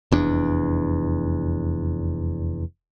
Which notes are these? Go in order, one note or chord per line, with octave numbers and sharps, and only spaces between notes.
F1 E2 D4